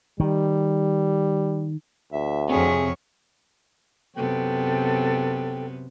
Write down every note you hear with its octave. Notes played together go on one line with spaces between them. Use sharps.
D#3 G3
D2 E5
F2 C3 G#4 C#5
F#2 C3 B3 A4 G5